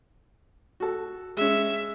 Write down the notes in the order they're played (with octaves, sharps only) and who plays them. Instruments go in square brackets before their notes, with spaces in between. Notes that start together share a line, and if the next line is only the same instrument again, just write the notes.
[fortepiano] F#4 A4
[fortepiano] G#3 C#4 [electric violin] E5